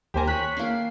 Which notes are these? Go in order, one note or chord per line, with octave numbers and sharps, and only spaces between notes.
D#2 A#3 G4 C5 G#5 A#5
C#5 F#6 B6
A#3 D4 C7